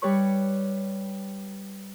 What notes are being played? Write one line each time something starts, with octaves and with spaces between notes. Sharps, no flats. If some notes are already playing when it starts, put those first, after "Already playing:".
G3 G4 B4 C#5 C#6